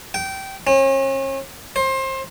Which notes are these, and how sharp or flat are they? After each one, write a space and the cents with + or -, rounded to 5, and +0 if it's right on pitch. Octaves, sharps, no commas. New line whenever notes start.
G5 -20
C#4 -40
C5 +25